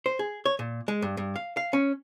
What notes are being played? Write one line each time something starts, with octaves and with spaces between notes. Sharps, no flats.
C5
G#4
C#5
A#2
G#3
G2
G2
F5
F5
C#4